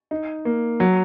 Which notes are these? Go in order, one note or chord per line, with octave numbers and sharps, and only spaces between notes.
D#4
A#3
F#3